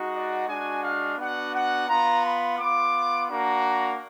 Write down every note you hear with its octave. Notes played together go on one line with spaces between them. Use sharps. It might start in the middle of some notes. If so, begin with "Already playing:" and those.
Already playing: G#3 D#4 F#4
D5
G#3 D4 F#4 G#5
F5
B3 D4 F#4 F#5
F#5
B3 F4 A#5
B5
B3 F4 D6
A#3 D4 F#4 A#5